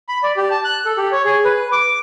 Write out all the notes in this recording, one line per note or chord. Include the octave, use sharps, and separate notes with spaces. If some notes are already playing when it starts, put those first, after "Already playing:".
B5
D5
G4
A5
F#6
A4
G4
C#5
G#4
B4
D6